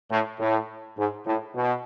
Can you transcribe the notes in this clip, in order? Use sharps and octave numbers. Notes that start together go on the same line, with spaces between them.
A2
A2
G#2
A2
B2